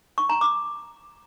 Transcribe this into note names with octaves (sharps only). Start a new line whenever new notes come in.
C#6
A#5
D6